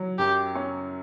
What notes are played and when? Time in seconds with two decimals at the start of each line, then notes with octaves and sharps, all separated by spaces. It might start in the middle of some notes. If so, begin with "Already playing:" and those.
Already playing: F#3
0.18 F#2 G4
0.55 C#4